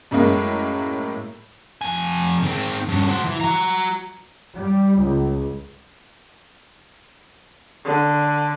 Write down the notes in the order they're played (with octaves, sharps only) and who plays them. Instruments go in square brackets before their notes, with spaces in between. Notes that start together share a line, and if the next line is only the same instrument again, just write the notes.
[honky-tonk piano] F#2 A2 G#3 A#3
[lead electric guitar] F2 G#5
D#3 C4
G2 C#4
F#4 C5
E3
F#4 A#5
[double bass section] G3
C#2
[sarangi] D3